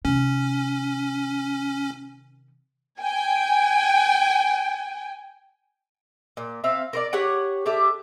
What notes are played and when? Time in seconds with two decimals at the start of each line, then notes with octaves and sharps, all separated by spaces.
0.05 C3 D#3 C#4
3.01 G5 G#5
6.37 A#2
6.64 C4 E5 F5
6.93 A#4 C5 D5
7.13 G4 B4 C#5 F#5
7.66 D4 G4 A4 E5